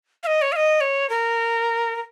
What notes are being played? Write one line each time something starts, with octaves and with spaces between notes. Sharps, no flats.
F5
D#5
C#5
F5
D#5
C#5
A#4
A#4